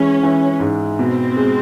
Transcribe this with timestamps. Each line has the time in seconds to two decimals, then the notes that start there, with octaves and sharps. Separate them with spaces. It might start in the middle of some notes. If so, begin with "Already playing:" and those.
Already playing: E3 G#3 C#4
0.23 E3
0.60 G#2
0.99 B2 C4
1.37 G#3